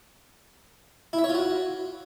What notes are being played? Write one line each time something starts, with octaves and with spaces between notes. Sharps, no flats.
E4
E5
C#5
F4
F#4